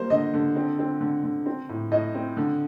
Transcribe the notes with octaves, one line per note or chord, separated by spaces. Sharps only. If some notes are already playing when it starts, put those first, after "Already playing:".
Already playing: G3 A#3 C5
D3 D#5
D3
C4
C4
D3
D3
C4
A2
A2 D#5
C4
D3